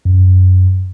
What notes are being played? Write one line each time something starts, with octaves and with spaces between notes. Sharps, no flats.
F#2